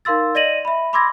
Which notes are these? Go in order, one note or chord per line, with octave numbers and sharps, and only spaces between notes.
D#4 A#4 F5 C6 E6 A6
D5 D#5 A#6 D#7 F#7
E5 B5
B5 C6 D6 E6 G#6 A#6